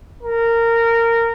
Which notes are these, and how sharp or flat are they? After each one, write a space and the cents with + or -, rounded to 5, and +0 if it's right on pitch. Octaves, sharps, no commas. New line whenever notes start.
A#4 -15